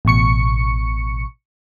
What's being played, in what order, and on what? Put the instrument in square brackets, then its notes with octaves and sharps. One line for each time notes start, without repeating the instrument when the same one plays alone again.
[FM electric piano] A1 B2 C#6 C#7